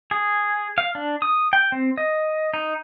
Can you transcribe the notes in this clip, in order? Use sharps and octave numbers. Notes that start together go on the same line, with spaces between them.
G#4
F5
D4
D#6
G5
C4
D#5
D#4